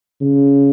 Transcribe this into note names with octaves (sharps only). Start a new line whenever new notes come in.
C#3